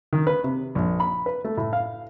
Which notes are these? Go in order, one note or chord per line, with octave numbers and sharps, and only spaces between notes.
D#3
B4
C3
A#1
B5
B4
A3
A2
F5